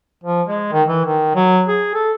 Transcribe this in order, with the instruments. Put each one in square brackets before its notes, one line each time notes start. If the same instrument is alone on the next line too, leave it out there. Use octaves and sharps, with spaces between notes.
[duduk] F3
G#3
D#3
E3
D#3
F#3
G#4
A4